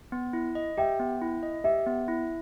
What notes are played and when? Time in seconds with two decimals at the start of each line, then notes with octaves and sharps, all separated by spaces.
0.12 B3
0.33 E4
0.55 D#5
0.77 G4 E5 G5
0.99 B3
1.22 E4
1.43 D#5
1.64 G4 E5
1.86 B3
2.08 E4